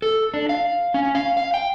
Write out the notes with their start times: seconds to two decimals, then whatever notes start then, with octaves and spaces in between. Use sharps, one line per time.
0.02 A4
0.34 D4
0.49 F5
0.94 C#4
1.15 F5
1.37 F5
1.54 G5